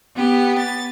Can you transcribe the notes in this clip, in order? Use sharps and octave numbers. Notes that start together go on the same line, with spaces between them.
B3 G4
A6